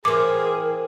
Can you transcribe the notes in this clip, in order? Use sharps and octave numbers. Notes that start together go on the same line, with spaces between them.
E3 C4 G#4 A#4 D6